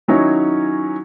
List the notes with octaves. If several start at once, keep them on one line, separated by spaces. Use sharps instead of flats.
D#3 F#3 C#4 D#4 E4 C#5